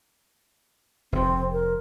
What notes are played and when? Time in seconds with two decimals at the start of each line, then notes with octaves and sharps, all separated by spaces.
1.12 F1 C3 C4
1.52 A#4